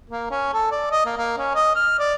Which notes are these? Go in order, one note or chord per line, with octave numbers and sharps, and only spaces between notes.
A#3
C#4
A4
D5
D#5
A#3
A#3
C#4
D#5
F6
D5